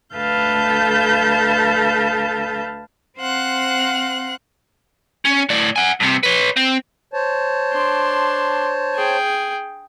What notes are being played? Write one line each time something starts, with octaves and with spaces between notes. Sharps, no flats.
D2 A4 B4 F5 A5 G6
C4 C5 F5 F#5 F#6
C#4
A2 D5
F#5 G#5
G2 C3
B4 C#5
C4
C5 C#5 A5
D4 C6
G#4 G5